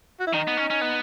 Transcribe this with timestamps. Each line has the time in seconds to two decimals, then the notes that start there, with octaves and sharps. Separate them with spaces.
0.20 F#4
0.27 E4
0.33 D#3 D#4
0.47 B3
0.57 C#4
0.70 C#4
0.81 B3